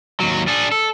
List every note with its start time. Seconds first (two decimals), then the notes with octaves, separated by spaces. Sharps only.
0.20 D#2 F#3
0.48 D4 G#4
0.71 A4